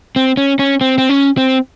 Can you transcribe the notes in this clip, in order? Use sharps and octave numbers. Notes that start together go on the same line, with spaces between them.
C4
C#4
C#4
C4
C4
C#4
C4